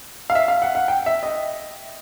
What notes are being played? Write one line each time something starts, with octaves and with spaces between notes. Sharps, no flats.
F5
E5
F5
F#5
F#5
G5
E5
D#5